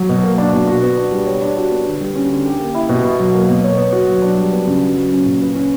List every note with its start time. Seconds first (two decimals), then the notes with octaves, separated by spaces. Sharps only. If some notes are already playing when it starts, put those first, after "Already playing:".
Already playing: F#3
0.09 B2
0.23 A#3
0.38 D4
0.53 B2
0.67 F#4
0.83 B3
0.98 D4
1.12 G3
1.27 C#5
1.42 D4
1.57 F#4
1.71 B3
1.86 D3
2.00 G3
2.15 C#4
2.30 D3
2.46 G4
2.60 A#3
2.75 E4
2.89 B2
3.04 B2
3.20 F#3
3.34 A#3
3.49 B2
3.64 C#5
3.78 B3
3.93 F#4
4.08 F#3
4.22 D4
4.38 G3
4.53 B3
4.67 C#3
4.82 F#4
4.96 F#3
5.12 C#4
5.26 A#2
5.41 B4
5.55 C#4